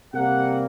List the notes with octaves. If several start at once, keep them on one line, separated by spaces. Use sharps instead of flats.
C3 G3 A#3 F#5